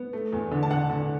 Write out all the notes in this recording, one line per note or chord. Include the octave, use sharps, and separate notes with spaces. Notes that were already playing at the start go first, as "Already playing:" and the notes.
Already playing: B3
A3
E2
D3
A5
D3 F#5
D3